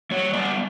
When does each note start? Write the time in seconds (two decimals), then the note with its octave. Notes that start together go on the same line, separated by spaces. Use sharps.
0.11 G3 C#5
0.33 B3 D5